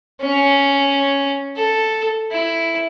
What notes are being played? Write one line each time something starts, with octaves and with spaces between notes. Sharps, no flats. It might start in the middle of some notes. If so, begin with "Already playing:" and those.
C#4
A4
E4